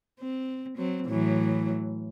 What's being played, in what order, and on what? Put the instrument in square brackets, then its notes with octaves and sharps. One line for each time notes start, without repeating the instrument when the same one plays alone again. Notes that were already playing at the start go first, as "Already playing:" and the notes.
[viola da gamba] C4
F#3 C4
A2 E3 F#3